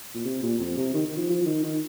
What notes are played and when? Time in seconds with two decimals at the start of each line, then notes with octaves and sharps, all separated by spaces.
0.15 A#2
0.25 C3
0.43 A#2
0.60 F2
0.77 C3
0.94 D#3
1.06 D#3
1.17 F3
1.29 F3
1.41 F3
1.46 D#3
1.63 D#3